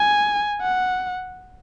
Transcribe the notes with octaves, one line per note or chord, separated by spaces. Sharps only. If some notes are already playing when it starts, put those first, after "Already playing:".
Already playing: G#5
F#5